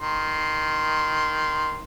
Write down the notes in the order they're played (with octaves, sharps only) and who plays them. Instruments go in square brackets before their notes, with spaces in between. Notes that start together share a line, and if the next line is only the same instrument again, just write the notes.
[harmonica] D#3 C6